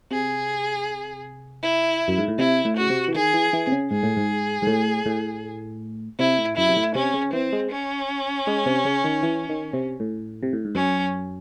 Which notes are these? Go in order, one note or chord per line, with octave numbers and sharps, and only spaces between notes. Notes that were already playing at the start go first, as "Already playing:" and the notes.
C3 G#4
E4
F#2
G#2
A2
C3 E4
A2
C#3 F#4
C3
E3
D#3 G#4
E3
E3
C3
C#3
G#2 G#4
A2
G#2
G#2
A2
A2
C3 E4
A2
F#2 E4
C3
A2
C3 C#4
C#3
E3 C4
G#3
C#4
G#3
C3
C#3
D#3
E3
D#3
C3
A2
C3
A2
G#2
F#2 C#4